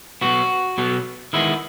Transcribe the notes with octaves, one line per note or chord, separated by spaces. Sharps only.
B2 F#3 B3 F#4
B2 F#3 B3
D#3 G#3 B3 E4